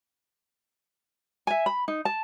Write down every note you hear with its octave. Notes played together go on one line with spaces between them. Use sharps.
E5 G#5
B5
D#4
A5